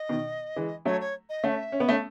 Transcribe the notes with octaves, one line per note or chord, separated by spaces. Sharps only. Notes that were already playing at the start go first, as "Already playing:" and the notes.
Already playing: D#5
B2 D#3
E3 G#3
F#3 A3 C#5
C#5
D#5
A3 C#4 F#5
E5
C#4
B3
A3 C#4